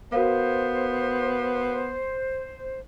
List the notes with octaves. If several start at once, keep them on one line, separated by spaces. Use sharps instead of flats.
B3 F#4 A#4 C5 F5